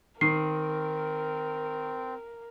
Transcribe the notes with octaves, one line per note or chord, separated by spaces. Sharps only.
D#3 C4 A#4 C7